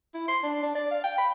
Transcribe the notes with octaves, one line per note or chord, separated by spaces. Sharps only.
E4
C6
D4
D4
D5
F5
G5
B5